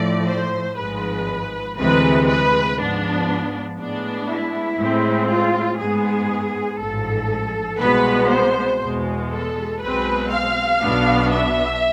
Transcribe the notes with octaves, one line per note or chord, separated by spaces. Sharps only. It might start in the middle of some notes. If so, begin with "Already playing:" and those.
Already playing: A2 F3 A3 D5
C5
G#1 G#2 F3 G#3 B4
D2 C3 E3 G#3 B4
B4
G#2 F3 B3 D4
A2 G#3 B3 D4
E4
A2 G#3 C4
F4
G#2 G#3 B3 G#4
A1 G#2 F3 A4
C2 B2 G#3 B3 B4
C5
E2 B2 G#3
A4
B1 B2 G#3 C4 B4
F5
B1 B2 B3 D4
E5